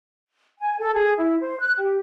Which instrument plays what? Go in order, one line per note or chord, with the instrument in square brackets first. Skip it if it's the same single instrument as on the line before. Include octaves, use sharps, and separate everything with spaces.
[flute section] G#5
A4
G#4
E4
C5
F#6
G4